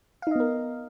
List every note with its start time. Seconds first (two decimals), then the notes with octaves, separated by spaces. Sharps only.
0.22 F5
0.27 D#4
0.31 D#5
0.36 B3
0.40 A#4